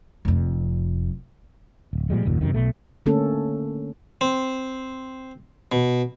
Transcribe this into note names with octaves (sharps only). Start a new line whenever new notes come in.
F1 F2
D1
A#2 F3 G3 G#3
F#1 D#2 A#2
F#2 A2 C3 D#3
B1 B2 A3
D3 A3 A#3 C#4 A4
C4
B2